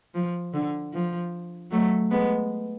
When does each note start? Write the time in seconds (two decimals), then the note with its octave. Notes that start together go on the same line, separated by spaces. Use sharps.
0.15 F3
0.53 D3
0.93 F3
1.71 F#3 A3
2.11 G#3 B3